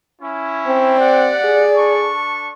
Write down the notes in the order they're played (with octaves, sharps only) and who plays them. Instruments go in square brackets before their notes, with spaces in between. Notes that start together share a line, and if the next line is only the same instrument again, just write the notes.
[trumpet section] C#4 E4
[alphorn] C4
[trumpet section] A#3 G4 F#5 [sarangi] D5
[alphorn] G#4
[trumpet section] D4 A4 C#6